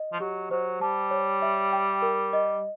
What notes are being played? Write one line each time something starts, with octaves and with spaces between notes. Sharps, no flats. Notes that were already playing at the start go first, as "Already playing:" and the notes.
Already playing: D#5
F3
F#3 G4
F#3 C5
G3 A5
C#5
E5
G5
A#4
D#5